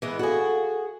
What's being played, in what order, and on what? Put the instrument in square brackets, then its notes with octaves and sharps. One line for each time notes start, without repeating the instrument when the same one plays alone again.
[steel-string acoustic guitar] E3 G#3 B3
[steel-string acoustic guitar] F#4 G#4 [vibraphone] A4 F5